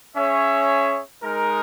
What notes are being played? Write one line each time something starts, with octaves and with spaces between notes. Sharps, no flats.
C#4 G#4 C#5 E5
G#3 D#4 A#4